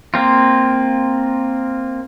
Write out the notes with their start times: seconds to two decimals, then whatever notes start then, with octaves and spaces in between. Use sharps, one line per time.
0.14 A#3 C4 F4